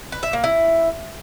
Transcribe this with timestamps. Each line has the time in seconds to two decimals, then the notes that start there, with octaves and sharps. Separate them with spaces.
0.12 B4
0.23 E5
0.33 A#3
0.44 E4